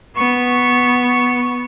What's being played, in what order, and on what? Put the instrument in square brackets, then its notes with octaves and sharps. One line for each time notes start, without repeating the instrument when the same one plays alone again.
[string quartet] B3 [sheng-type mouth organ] C#6